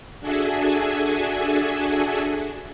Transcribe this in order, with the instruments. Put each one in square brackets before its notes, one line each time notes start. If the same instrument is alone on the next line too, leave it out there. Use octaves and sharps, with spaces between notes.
[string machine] D4 F#4 G#4 A4 E5 G#5